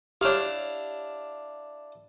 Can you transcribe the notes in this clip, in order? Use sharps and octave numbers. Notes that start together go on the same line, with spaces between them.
D4 E4 G4 C#5 F5